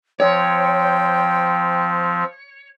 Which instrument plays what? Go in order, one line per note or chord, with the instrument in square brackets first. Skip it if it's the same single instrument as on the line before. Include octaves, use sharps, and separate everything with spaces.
[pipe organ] F3 [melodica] C4 [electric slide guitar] C#5 [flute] G5